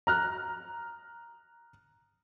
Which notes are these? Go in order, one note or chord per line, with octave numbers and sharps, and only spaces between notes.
A#5 F6 F#6